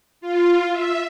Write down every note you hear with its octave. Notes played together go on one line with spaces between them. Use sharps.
F4
E5